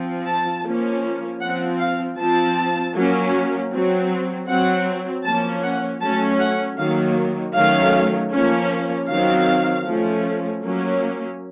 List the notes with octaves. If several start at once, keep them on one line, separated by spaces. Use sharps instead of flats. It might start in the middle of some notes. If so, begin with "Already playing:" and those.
Already playing: F3 C4
A5
F3 A#3 C#4
F3 C4 F#5
F5
F3 C4 A5
F#3 A#3 C#4
F#3 C4
F#3 C4 F#5
F3 A#3 C#4 A5
F#5
F#3 A3 C#4 A5
F#5
D#3 F#3 A#3 F5
D#3 F#3 A3 C#4 F5
F3 A#3 C#4
D#3 F#3 C4 F5
F3 A3 C#4
F#3 A#3 C#4